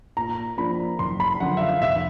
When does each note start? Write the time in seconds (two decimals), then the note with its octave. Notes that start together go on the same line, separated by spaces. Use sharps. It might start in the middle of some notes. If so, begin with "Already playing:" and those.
0.17 A#2 A#5
0.57 F3 A#3 D4 F4 B5
0.99 F#1 C6
1.20 B5
1.40 F#2 D3 F3 F#5
1.57 E5
1.61 F5
1.82 F1 E5